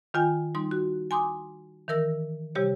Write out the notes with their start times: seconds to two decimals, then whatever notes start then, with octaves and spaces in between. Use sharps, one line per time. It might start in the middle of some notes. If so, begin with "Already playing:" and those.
0.14 D#3 F4 G5 G#5 G6
0.55 G3 D#4 C6
0.71 F#4
1.11 G#5 C6 D6 D#6
1.88 D#3 E3 A#4 E6 A#6
2.55 C3 G3 G4 C#5